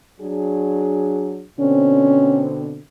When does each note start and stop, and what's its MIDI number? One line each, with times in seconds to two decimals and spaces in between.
0.20 1.44 54
0.20 1.44 62
0.20 1.44 68
1.60 2.78 47
1.60 2.78 50
1.60 2.78 60
1.60 2.46 61